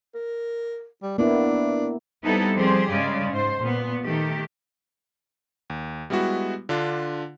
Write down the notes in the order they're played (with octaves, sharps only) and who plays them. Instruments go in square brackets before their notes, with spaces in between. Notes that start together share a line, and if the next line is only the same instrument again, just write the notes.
[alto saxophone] A#4
G3
[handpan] A#3 B3 E4 [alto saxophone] D4
[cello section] G3 B3 C4 D#4 E4 A4
F3 G3 C4 G4 G#4 C5
G2 C#3 G#3 D5
G#2 C5
A#2 B3
D#3 A3 G4
[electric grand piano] D#2
G3 G#3 B3 E4 F#4
D3 D4 F4